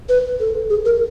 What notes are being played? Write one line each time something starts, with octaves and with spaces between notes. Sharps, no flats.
B4
A4
G#4
A#4